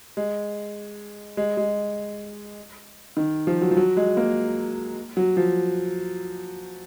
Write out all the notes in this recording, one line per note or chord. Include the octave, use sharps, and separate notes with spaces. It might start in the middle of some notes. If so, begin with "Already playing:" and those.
G#3
G#3
G#3
D#3
F3
F#3
F3
F#3
G#3
A#3
F#3
F3